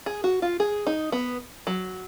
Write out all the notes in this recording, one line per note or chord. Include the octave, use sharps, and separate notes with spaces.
G#4
F#4
F4
G#4
D#4
B3
F#3